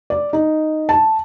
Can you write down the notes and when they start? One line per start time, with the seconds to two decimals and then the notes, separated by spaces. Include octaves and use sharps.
0.10 D5
0.33 D#4
0.89 A5